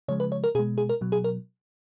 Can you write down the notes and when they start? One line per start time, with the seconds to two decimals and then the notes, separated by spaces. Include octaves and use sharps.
0.08 C#3 F3 G#3 C#5
0.20 B4
0.32 C#5
0.44 A#4
0.55 B2 G#4
0.59 G#3
0.78 G#4
0.89 A#4
1.01 B2 F#3
1.12 G#4
1.24 A#4